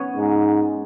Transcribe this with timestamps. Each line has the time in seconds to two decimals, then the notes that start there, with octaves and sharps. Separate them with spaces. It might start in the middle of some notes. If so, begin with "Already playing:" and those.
Already playing: B3 C#4
0.17 G#2